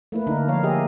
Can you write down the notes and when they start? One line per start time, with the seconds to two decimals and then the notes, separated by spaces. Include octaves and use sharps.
0.12 A3 A#3 E4 B4
0.27 D3 D4 D#4 A#4
0.48 F3 A#3 C#5 F5
0.64 G4 G#4 D#5 E5